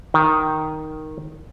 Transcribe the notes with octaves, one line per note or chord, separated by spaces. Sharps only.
D#3